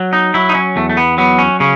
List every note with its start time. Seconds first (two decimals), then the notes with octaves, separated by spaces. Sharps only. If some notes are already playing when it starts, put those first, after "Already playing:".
Already playing: F#3
0.13 D#4
0.34 F#3 E4
0.49 D#4
0.55 C#4
0.76 E2 A3
0.89 A3
0.97 B3
1.18 F#3 B3
1.39 C#4
1.60 C#3 C#4